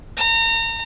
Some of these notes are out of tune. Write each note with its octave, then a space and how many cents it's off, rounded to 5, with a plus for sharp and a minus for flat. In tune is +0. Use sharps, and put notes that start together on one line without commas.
A#5 -35